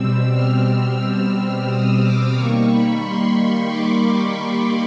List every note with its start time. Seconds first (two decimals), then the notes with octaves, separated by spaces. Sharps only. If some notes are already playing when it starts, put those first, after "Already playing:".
Already playing: B2 G3 C4 E6
0.32 F6
0.66 F6
0.99 F6
1.33 E6
1.66 D#6
2.01 D6
2.34 D#3 G3 A#3 C#6
2.68 B5
3.02 C6
3.36 C#6
3.70 D6
4.38 D6